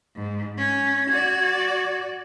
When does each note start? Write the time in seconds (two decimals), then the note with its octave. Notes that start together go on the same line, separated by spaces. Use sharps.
0.16 G#2
0.58 C#4 G#6
1.11 F#4 D5